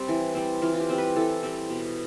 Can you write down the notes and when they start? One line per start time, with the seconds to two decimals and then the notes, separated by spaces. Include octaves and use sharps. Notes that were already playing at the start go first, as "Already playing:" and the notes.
Already playing: G3 C4
0.08 E3
0.35 G3 C4
0.62 E3 F4
0.74 F4
0.80 G4
0.89 G3 C4
0.98 B4
1.16 E3 A4
1.43 G3 C4
1.70 B2